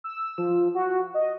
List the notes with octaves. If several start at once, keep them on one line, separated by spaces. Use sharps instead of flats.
E6
F3
F#4
D#5